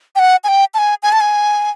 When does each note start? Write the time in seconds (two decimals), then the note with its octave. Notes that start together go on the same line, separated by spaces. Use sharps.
0.16 G5
0.19 F#5
0.44 G#5
0.48 G5
0.74 A5
0.78 G#5
1.03 G#5
1.12 A5
1.21 G#5